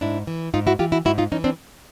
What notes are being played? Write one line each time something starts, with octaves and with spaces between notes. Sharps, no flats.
G#2 D4 E4
E3
G#2 D#4 F4
E4 F#4
E3 F4 G4
E4 F#4
G#2 E4 F#4
D#4 F4
E3 C#4 D#4
C4 D4